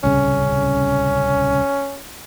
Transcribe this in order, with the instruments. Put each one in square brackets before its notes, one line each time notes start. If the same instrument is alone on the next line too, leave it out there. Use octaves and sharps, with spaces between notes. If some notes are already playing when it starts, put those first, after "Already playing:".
[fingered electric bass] D1 C2 C#3 [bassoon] C#4